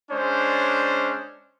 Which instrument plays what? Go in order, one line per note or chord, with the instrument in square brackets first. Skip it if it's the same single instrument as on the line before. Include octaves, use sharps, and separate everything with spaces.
[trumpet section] G#3 C#4 D4 C5